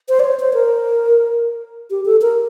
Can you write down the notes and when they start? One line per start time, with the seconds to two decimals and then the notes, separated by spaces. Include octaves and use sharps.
0.09 C5
0.20 D5
0.24 C#5
0.40 C5
0.54 A#4
1.90 G4
2.06 A4
2.21 A#4